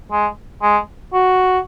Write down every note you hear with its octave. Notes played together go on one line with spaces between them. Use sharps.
G#3
G#3
F#4